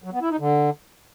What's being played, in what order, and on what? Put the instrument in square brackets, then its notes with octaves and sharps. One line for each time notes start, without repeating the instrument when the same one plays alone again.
[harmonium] F#3
B3
E4
D#4
D3